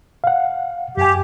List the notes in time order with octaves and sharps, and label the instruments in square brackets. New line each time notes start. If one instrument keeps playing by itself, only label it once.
[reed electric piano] F5 F#5
[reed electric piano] F#2 G#5 [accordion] G4